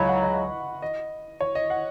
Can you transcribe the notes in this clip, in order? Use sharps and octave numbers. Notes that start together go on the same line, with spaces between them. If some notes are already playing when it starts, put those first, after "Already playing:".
Already playing: C#2 C#3 F#3 B5 C#6
F#5
D#5
D#5
C#5
D#5
F#5